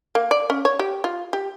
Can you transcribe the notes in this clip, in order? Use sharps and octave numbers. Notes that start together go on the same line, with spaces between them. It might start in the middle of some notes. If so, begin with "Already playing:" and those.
A#3
D5
C#4
C#5
G4
F4
G4